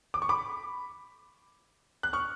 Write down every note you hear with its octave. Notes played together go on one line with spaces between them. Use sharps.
D6
C#6
B5 D6
F#6
C#6 F6